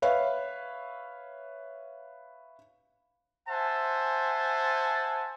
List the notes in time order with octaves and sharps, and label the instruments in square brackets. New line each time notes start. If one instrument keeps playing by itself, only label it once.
[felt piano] B4 C#5 E5 F5
[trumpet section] C5 E5 F#5 G#5 A5